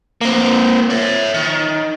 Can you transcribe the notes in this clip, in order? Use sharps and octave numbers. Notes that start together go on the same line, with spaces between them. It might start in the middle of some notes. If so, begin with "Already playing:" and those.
A#3 C4
C#5 E5
D#3